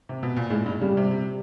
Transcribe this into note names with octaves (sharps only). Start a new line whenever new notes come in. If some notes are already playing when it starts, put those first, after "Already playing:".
C3
B2
A#2
A2 G#3
G2
C#3 G3
C3